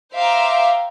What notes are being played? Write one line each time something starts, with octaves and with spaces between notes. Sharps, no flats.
C5 E5 F5 G5 A#5 D6